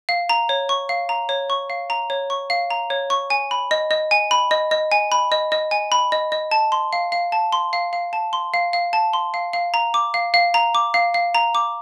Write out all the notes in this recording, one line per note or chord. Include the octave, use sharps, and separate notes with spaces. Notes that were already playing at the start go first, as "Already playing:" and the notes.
F5
A#5
C#5
C#6
F5
A#5
C#5
C#6
F5
A#5
C#5
C#6
F5
A#5
C#5
C#6
G#5
B5
D#5
D#5
G#5
B5
D#5
D#5
G#5
B5
D#5
D#5
G#5
B5
D#5
D#5
A5
C6
F5
F5
A5
C6
F5
F5
A5
C6
F5
F5
A5
C6
F5
F5
A#5
D6
F5
F5
A#5
D6
F5
F5
A#5
D6